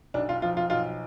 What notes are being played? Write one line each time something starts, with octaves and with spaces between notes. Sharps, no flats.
B1 D4
F4
F3 F4
F4
B1 F4